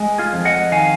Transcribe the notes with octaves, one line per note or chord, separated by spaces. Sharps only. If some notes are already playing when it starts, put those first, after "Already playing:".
Already playing: G#3
F4 G#4
F2
D#5 F#5
D#3 F5 G#5